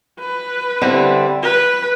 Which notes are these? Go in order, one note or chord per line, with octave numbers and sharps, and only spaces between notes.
B4
D3 G3 C4 E4
B4